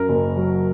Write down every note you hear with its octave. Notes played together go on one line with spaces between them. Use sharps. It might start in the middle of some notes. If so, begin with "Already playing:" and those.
Already playing: F#2 A#4
F#1
F#3